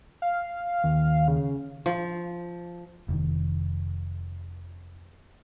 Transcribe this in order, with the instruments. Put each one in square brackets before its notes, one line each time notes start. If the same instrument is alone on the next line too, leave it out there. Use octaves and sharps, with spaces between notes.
[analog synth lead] F5
[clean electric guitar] D#2
[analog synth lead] C#3
[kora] F3
[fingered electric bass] F1 D#3